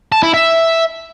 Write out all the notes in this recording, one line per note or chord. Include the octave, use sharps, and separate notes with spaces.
A5
E4
E5